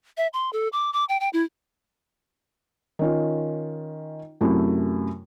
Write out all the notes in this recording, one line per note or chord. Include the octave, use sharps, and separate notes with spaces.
E5
C6
A4
D6
D6
G5
G5
E4
D#3 C#4 F4
F#2 C3 A3 E4